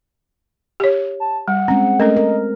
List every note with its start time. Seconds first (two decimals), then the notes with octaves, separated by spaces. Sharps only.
0.80 G4 C#5
1.20 A5
1.48 G3 F#5
1.68 G#3 C4 C#4
2.00 A3 C#4 A4 A#4 D#5
2.17 A#4